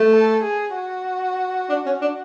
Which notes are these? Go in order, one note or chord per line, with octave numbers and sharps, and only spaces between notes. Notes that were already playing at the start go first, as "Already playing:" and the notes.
Already playing: A3
A4
G#4
F#4
D4
C#4
D4